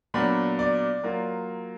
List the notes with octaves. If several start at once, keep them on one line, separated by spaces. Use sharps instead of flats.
A#2 F#3 B3 D4 B5
D5
F#3 A#3 F4